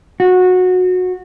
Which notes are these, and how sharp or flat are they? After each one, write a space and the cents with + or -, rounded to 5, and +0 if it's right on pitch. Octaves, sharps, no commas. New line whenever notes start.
F#4 -20